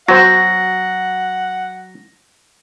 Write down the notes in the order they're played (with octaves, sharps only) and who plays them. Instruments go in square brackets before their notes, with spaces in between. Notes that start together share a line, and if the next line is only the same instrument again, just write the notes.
[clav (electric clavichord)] F#3 [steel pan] F#4 C5 [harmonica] F#5 [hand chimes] A#6